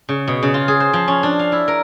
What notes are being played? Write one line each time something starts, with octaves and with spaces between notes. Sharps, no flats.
C#3
B2
C#3
F4
G#4
C5
F3
C#4
D4
F5
E4
A#4